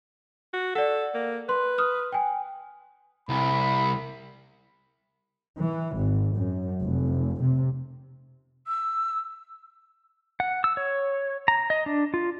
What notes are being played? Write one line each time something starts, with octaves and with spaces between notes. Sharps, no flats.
F#4
A4 D5 F#5
A#3
B4 C6
D#6 F6
G5 G#5
C2 B5
E3
G#1
F#2
F1
C3
E6
F#5
E6
C#5
A#5
D#5
D4
F4